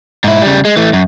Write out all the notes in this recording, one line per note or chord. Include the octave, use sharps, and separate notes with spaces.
G#2 E4
C#3 G3
G#3
E3 A3
F#2